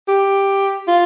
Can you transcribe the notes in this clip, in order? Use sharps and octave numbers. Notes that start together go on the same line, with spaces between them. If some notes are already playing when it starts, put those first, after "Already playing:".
G4
F4